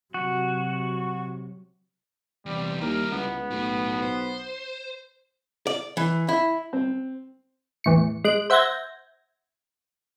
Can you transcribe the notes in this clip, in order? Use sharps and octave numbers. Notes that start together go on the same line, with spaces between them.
C3 F#3 F#4
E2 C3 G3
D#2 G3 E4 A#4
C#2 B3
B1 A2
C5
D5
E3
E4
C4
E2 A2 C#7
G#3 F#6 D7
C5 E5 F#5 G6 G#6 A#6